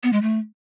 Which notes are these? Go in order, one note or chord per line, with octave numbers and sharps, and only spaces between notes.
B3
G#3
A3